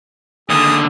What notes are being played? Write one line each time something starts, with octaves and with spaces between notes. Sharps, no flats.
D#2 D3 G#4 D#6